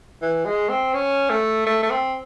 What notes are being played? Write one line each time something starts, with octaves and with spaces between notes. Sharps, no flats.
E3
G#3
C4
C#4
A3
A3
A3
C4